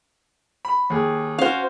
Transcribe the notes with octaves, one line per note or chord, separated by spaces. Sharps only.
B5
D#2 G#4
C#4 F#4 C5 F5